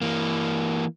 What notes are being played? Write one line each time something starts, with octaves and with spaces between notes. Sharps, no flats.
E3 A#3